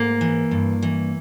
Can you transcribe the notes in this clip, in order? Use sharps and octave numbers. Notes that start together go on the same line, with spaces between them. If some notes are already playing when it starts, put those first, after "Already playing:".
Already playing: G#2 A#3
E3
G2
E3